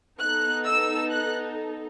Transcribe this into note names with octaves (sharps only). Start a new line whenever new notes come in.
B3 D#4 A4 F#6
E6
F#6